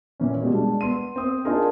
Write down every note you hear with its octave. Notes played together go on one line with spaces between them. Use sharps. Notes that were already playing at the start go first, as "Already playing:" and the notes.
A#2 E3 B3 C#4
B2 G3 G#3
G#3 D4
B3 C6 D#7
C4 D#6
A#3 D4 D#4 F4 G#4 A#4